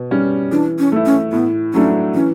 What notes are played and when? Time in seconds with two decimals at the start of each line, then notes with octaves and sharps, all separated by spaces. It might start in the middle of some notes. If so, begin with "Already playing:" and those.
Already playing: B2
0.11 G3 C#4
0.51 E3 D4
0.79 C#4
0.92 A3 E4
1.06 C#4
1.32 A2 B3
1.73 F#3 A3 C#4 D4
2.14 E3 C#4